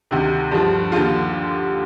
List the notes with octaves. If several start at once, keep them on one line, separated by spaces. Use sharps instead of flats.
D2 C3 D#3
G2 D3 F3
D#2 D3 F3 F4